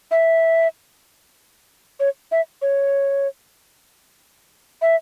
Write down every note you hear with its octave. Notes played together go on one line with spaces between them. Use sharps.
E5
C#5
E5
C#5
E5